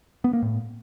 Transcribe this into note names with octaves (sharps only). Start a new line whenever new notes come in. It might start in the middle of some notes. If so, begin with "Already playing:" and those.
B3
A#3
A2